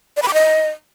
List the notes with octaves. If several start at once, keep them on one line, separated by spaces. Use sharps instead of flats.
D5
B5
D6
D#5